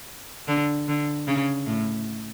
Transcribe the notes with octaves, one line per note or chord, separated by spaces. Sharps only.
D3
D3
C#3
A2